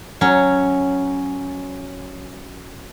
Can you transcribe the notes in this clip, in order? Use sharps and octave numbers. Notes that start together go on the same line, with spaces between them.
F#3 C#4